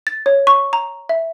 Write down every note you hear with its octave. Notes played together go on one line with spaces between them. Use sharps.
A6
C#5
C#6
A#5
E5